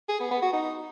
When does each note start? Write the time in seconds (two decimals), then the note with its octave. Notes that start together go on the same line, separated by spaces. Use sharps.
0.09 G#4
0.20 B3
0.31 B3
0.42 F#4
0.53 D#4